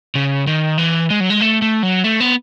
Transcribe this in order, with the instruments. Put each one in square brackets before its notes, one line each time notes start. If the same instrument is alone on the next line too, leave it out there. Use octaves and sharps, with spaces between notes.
[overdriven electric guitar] C#3
D#3
E3
G#3
F#3
G#3
A3
A3
F#3
A3
B3